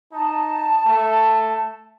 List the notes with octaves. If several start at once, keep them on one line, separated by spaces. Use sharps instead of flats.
D#4 A5
A3